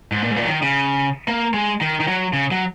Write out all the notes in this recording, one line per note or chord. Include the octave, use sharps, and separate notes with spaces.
G#2
A#2
G#2
A#2
F#3
D#3
C#3
A#3
G#3
D#3
D#3
F#3
C#3
F#3